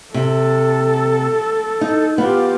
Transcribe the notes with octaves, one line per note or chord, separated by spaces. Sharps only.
C3 A4
D#4
B3 F4 G4